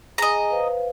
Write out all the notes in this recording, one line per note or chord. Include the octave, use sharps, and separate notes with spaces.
G#4 D#5 G#5 A#5
B4 C5 F5